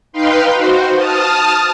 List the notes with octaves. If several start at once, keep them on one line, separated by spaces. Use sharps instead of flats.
D#4 B4 F5 G5 C6
F#4 C5
A5 D#6 F6